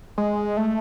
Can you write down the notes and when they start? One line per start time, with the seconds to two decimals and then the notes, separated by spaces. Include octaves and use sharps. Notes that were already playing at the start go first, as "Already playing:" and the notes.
0.18 G#3
0.57 A3